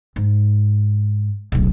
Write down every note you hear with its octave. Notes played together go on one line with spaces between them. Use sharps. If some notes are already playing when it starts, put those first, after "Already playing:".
G#2
D1 B1